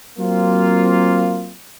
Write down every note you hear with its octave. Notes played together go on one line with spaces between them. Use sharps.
F#3 A#3 C4 F4